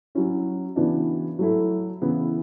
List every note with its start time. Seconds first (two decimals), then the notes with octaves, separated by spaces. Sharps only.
0.15 F#3 C#4 E4
0.76 C#3 E3 B3 D4 F#4
1.39 F#3 A3 E4
2.02 C#3 E3 B3 E4